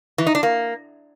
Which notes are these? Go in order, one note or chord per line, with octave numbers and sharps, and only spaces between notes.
E3
D#4
D4
A#3